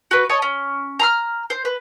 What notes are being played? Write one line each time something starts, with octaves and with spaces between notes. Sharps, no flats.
F#4 B4
C#5 D#5 A5
C#4
A#5 C6 F6
C5
B4